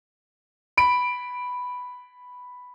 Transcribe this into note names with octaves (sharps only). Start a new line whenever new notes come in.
B5 D7